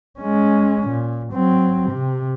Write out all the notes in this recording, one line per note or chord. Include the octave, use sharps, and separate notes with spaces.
G#3 C#4
A#2
F#3 C4
C3